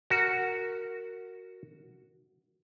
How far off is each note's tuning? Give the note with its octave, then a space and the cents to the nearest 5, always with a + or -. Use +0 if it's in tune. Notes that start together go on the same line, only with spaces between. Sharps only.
F#4 +0 A#4 -10